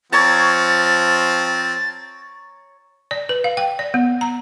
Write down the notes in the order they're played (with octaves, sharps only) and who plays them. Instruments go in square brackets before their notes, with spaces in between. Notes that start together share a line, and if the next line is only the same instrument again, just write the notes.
[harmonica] F3 C4 [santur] C#5 A#5 [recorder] A6
[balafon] D5
B4
F5
G5
D5
B3
A#5